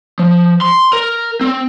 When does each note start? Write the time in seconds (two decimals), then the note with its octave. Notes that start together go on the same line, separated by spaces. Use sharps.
0.19 F3
0.61 C6
0.93 A#4
1.41 C4